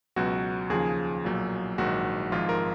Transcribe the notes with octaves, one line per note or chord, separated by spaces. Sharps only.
C#2 B2 F#3 F#4
D#2 C#3 F3 G#4
B1 A#2 F#3
A#1 G#2 D#3 F#3 F#4
G#1 G#2 F3 F4
A#4